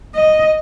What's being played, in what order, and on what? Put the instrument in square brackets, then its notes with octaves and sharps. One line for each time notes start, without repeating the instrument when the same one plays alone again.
[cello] D#5